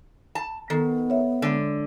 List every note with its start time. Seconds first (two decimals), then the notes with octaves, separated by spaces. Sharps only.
0.35 A5
0.70 D#3 B3 A4
1.10 C#5 E5
1.42 D3 G#3